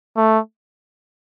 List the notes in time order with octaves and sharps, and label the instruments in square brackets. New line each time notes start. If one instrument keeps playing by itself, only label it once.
[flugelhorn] A3